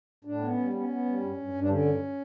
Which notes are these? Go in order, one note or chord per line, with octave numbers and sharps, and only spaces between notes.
A2 D4
B3
C#4
G3
B3 C#4
B3
G3
G2
G2
G2
D4
D3 C#4
G2